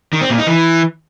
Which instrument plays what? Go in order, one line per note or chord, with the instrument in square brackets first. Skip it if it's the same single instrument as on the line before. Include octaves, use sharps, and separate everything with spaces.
[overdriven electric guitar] D#3
C4
A#2
D#4
E3